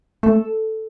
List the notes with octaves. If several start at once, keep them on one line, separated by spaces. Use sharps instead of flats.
A3 A4